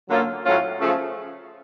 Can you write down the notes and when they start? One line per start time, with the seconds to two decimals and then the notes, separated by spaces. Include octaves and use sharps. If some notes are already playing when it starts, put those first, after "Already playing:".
0.08 D3 F#3 A#3 C#4 F4
0.44 A2 F#3 A3 C#4 F4
0.80 C#3 F3 A3